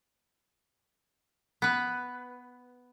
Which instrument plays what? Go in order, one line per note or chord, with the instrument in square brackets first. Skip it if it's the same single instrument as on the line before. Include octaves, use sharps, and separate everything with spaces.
[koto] B3 B4